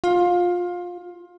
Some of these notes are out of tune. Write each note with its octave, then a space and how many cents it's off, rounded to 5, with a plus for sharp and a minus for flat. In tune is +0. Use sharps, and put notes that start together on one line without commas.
F4 +20